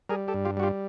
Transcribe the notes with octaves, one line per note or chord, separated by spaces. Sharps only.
G3 G#4 A#4
G4 A4
G2
F4 G4
G3 F#4
F4 G4